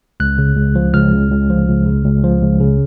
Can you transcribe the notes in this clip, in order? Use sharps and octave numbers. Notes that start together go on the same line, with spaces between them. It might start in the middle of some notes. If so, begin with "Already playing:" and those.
C#2 F#6
C#3
C#2
F3
C#2 F6
C#3
C#2
F3
C#2
C#3
C#2
F3
C#2
C#3